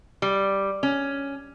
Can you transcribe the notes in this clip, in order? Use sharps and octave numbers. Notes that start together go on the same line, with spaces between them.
G3
C#4